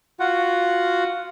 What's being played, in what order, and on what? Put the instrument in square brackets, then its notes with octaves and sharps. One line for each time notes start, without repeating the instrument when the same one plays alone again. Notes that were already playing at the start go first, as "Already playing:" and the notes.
[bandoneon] F4 F#4 F#5